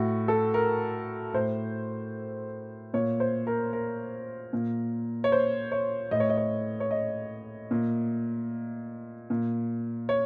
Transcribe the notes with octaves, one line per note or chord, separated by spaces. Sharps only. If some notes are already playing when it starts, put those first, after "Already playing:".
Already playing: A2 F#4
A4
A#4
A2 C5
A#2 C#5
C5
A#4
A#4
A#2
C#5
C5
C#5
A2 D#5
C#5
D#5
C#5
C#5
D#5
A#2
A#2
C#5